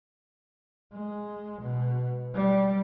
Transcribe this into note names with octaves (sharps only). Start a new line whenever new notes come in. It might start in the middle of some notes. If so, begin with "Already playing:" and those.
G#3
B2
G3